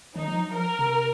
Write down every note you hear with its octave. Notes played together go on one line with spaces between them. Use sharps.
D#3 D#4
F3
F#3
F3 A#4
C3